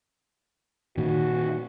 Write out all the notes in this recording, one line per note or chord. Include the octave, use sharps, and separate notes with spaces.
A#2 D#3 F#4